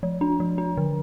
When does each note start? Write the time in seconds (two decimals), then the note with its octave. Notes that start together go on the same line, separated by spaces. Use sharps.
0.03 F3
0.21 D4
0.40 F3
0.58 D4
0.77 D3